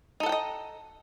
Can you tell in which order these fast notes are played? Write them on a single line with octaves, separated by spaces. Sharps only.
D#4 A4 F#5 G5 D#5